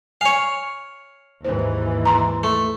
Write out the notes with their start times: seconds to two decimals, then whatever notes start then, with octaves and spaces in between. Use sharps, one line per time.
0.21 C#5 F5 G#5
1.45 D#2 G#2 E3 E4 C5
2.05 A#5 C6
2.43 A3